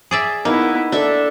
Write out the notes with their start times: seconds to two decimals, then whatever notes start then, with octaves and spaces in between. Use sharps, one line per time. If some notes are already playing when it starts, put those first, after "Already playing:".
0.11 G#4 D5 E5
0.45 A#3 B3 D#4 E4
0.92 D4 A4 E5